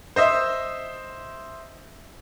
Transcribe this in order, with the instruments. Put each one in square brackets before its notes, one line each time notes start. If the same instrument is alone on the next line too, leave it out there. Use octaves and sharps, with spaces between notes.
[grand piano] C5 D#5 E5